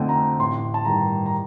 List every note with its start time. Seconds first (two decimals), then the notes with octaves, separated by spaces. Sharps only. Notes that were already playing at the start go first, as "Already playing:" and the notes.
Already playing: F2 D3 A3 C4 D#5 G5 A5
0.09 A#5
0.39 A1 C6
0.74 A5
0.85 G2 D#3 G3 A#5
1.26 A#5